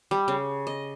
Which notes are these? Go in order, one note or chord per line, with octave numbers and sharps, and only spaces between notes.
G3
C#3
D#5